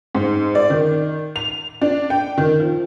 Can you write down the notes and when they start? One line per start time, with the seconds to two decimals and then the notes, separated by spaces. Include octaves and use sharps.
0.15 G#2
0.55 D5
0.70 D#3
1.36 F7
1.81 D4
2.10 G5
2.38 D#3
2.60 F3